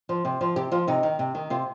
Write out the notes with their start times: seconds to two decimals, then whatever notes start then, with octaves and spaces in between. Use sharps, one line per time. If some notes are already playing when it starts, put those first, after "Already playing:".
0.09 F3
0.25 C3
0.41 F3
0.56 C3 G4
0.72 F3 F4
0.88 C3 D#4
1.03 D#3
1.19 C3
1.35 D#3
1.50 C3 F4